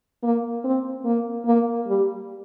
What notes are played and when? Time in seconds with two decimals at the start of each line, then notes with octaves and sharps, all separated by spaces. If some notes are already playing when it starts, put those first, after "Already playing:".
0.23 A#3
0.64 C4
1.05 A#3
1.45 A#3
1.87 G3